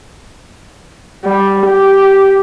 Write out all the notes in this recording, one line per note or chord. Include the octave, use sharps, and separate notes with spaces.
G3
G4